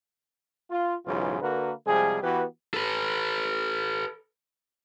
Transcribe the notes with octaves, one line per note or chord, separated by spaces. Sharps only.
F4
B1 G#2 C#3 E3 F#3 F4
D3 A#3 F#4 A#4 B4
C3 F3 G3 G#3 G#4
E3 B3 F#4 G4 B4
A4 B4